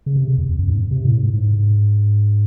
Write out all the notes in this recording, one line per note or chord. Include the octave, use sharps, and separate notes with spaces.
C#3
C3
E2
E2
F#2
G#2
C3
A2
G#2
G#2